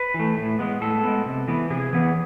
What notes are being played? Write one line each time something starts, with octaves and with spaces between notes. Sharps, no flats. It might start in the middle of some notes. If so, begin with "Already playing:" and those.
Already playing: B4
E3
A3
A2
G#3 B3
A2 A4
G#3 B3
C3
E3 B3
C3 G#4
E3 B3